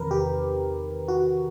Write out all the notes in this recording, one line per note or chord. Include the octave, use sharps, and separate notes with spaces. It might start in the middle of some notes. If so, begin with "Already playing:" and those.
Already playing: E2 C3 D#3 A#4 B4
G4
F#4